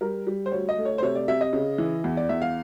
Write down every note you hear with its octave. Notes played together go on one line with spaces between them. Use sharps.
G3 A#4
G3
C5
D2 C#5
D#5
A3
C#5
C5
C3 C#5
D5
C3 E5
D#5
C#3
E3
E2
D5
E2 E5
F5